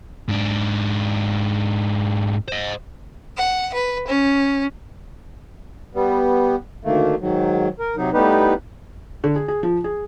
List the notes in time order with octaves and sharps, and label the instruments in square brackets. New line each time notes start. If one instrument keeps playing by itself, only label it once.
[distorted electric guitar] G#2 D4
C5 D#5
[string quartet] F#5
B4
C#4
[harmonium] G3 B3
D2 D#3 A3 A#3
G#2 D#3 F#3
A#4
C3 F#3 D#4
A2 G3 B3 D#4 G4 B4
[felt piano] D3
G#4
G#4
F3
G#4